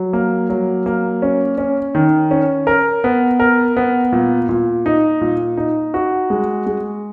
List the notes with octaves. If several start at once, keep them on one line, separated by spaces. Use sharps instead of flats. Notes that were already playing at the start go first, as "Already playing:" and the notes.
Already playing: F#3
A#3
F#3
A#3
C#4
C#4
D#3
C#4
A#4
B3
A#4
B3
A#2
A#2
D#4
A#2
D#4
F#4
G#3
G#3